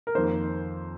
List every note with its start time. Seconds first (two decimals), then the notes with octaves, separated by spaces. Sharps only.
0.07 A#4
0.15 F2 D#3 A#3 C5